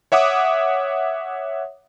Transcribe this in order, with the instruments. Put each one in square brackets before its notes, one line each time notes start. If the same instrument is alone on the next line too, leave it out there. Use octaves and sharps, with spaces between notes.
[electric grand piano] C#5 E5 F#5 D6 D#6